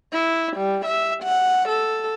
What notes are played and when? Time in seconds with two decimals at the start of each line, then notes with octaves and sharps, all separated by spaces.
0.13 E4
0.57 G3
0.86 E5
1.23 F#5
1.68 A4